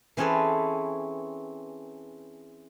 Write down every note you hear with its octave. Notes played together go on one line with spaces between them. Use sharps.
E3 C4 C#4 G#4 A4 B4